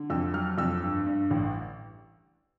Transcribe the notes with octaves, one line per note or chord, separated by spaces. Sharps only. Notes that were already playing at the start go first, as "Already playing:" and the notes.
Already playing: D3
F2 E6
F#3 F6
F2 E6
G2
G2
A1